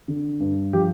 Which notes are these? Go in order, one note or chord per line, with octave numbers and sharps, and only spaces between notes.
D3
G2
F3 G4